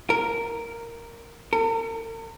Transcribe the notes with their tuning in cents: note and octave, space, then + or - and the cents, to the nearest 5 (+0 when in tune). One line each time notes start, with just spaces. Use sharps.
A#4 -5
A#4 -45